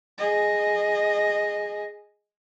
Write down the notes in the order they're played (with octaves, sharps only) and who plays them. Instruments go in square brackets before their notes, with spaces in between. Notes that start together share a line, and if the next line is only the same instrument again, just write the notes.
[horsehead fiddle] G#4 D#5